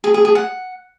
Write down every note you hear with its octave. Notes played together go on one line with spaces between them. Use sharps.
G#4
G#4
G#4
F#5